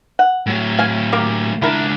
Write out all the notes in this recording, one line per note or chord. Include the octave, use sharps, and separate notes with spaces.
F#5
A2 F#3
F5 G#5
A#3 G4 A#4
C#2 D4 E4 A#4